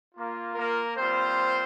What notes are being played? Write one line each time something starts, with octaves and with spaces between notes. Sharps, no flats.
A#3 F4
A#3 A#4
G3 A#3 C4 F4 C5